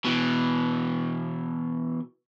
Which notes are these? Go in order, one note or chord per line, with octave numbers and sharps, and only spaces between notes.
B2 E3